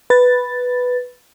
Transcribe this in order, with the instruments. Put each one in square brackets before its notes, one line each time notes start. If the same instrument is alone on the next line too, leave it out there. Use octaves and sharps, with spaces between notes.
[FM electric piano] B4 A6